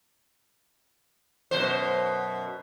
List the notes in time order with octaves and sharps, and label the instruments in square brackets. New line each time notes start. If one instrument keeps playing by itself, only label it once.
[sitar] F#2 B2 C5